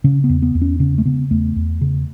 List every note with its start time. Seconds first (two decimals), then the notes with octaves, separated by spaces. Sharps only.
0.04 C#3 C#4
0.24 B3
0.29 E2
0.42 B3
0.55 E2
0.62 C#4
0.80 C#3 C#4
0.98 A3
1.06 C#3 B3
1.31 E2 A3
1.56 E2
1.81 C#3